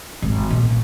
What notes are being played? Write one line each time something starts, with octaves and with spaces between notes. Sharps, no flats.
G#1
A#2